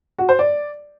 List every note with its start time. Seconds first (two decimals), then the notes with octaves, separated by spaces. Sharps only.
0.18 F#4
0.29 C5
0.39 D5